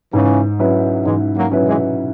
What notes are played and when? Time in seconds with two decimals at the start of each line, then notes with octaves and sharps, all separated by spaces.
0.13 G#2 C#3 E3
0.59 F#3 C#4 E4 B4
1.05 G#2 E3 G#3
1.36 F#3 A#3
1.51 F#3 C#4 E4 B4
1.66 E3 G#3